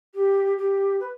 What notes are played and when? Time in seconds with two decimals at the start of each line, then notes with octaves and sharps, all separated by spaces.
0.14 G4
0.58 G4
1.00 B4